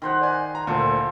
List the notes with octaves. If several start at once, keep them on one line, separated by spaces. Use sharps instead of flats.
D#3 C5 F#5
D5 G#5
A#5
D2 A#2 F4 A4 C5